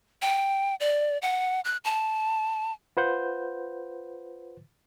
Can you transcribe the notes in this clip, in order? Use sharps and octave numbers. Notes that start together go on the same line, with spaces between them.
G5
D5
F#5
F#6
A5
F4 B4 C5 F#5 G6